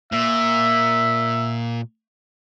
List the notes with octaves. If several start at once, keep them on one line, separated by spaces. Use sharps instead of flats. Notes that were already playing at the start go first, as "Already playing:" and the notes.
A#2 E5